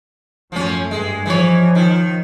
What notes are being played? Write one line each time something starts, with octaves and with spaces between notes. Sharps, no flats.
F#2 F3 A3 C#4
G2 G#3
E3 F3 C#5
D#3